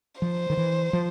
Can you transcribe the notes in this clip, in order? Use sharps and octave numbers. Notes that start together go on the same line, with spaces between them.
F3 C5
D#3
E3
F3